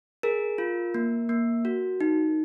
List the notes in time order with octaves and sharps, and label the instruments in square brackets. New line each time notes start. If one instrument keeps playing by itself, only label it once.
[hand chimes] G#4 A#4
F4
A#3
A#3
F#4
D#4